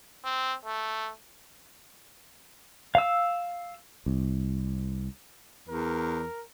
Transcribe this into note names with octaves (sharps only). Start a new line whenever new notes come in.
C4
A3
F5 E6
C2
E2 A#4